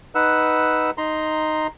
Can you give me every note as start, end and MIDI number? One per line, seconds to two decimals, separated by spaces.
0.15 0.90 63
0.15 0.90 71
0.15 0.90 78
0.15 0.90 88
0.98 1.67 63
0.98 1.67 82
0.98 1.67 84